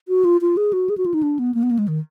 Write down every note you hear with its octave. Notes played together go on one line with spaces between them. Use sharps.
F#4
F4
F4
G#4
F#4
G#4
F#4
F4
D#4
D4
B3
A#3
B3
A#3
G#3
D#3